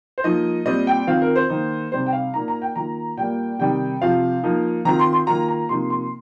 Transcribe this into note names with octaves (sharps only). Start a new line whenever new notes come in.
C5
F3 A#3 D#4 D#5
A#2 G3 C4 D#5
G5
D#3 C4 F4 F5
A#4
C5
D#3 A#3 D#4
C3 G3 D#4 C5
G5
F5
A#2 A#3 D#4 A#5
A#5
G5
D#3 A#3 F4 A#5
A#2 G3 A#3 G5
C3 D#3 G3 D#4 G5
C3 F3 C4 F4 F5
F3 A#3 D#4
D#3 C4 F4 A#5
C6
C6
D#3 A#3 F4 A#5
A#5
C3 F3 A#3 D#4 C6
C6